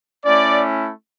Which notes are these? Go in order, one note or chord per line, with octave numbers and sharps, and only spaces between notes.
A3 C#4 E4 D5